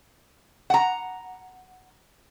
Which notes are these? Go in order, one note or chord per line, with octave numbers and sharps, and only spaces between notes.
F#5 A#5